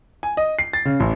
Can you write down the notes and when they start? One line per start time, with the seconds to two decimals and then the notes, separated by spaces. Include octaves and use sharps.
0.23 G#5
0.37 D#5
0.59 C7
0.73 A6
0.85 C#3
1.00 A1